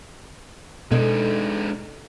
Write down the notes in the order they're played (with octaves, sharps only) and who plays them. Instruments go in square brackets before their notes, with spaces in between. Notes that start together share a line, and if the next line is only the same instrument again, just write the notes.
[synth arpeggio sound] B2 [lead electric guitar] G#3 D4 [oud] D#4 G#4 A4